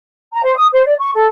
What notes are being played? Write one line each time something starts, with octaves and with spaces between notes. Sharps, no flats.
A#5
C5
D#6
C5
D5
C#6
A4